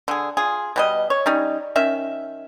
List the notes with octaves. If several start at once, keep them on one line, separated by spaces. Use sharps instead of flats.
D3 G#4
F4 G#4
B2 G3 D#5
C#5
G3 C#4 D#4
D#3 C#4 E5